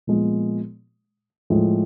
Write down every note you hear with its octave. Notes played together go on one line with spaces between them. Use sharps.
A#2 F3 G#3 B3
A2 F3 G#3